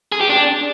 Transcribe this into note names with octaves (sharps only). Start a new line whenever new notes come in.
G#4
G4
D4